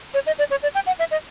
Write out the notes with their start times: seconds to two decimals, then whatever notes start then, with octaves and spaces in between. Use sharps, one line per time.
0.14 C#5
0.26 D#5
0.39 D5
0.51 C#5
0.62 D5
0.75 G5
0.86 F#5
0.99 E5
1.11 D#5